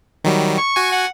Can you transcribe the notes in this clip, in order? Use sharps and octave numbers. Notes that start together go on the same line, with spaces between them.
D#3 F#3 G3
C#6
F#4 G#5
F#5